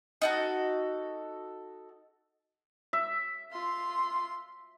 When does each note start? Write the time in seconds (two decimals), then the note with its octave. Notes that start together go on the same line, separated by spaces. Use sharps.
0.22 D#4 F#4 A4
2.93 E5
3.51 F4 C6